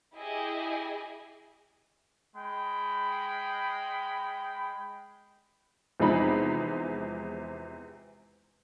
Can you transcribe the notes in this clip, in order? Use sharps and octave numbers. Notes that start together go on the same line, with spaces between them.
E4 G4 G#4 D#5 G#5
G#3 G5 B5
E2 C3 F3 G#3 D#4 B5